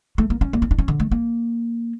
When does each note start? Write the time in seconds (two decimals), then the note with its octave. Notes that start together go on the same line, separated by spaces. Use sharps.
0.18 A3
0.30 A#3
0.41 C#4
0.53 A#3
0.62 C#4
0.71 D4
0.79 C#4
0.88 D3
1.00 A3
1.11 A#3